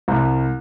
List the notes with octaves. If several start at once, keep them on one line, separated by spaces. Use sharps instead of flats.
C2